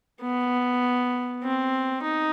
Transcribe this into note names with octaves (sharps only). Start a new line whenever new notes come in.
B3
C4
D#4